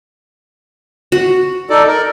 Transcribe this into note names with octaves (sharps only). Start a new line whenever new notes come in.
F#4
D#4 A4 D5
A#4